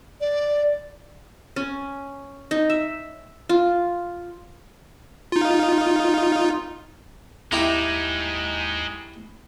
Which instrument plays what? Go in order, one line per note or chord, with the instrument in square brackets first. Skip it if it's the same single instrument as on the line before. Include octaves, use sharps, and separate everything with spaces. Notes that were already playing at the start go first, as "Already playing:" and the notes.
[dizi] D5
[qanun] C#4
D#4
E5
F4
[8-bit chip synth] D#4 F4
[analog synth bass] D#2 [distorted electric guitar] G#3 D#4 [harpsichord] E4 G4 A#5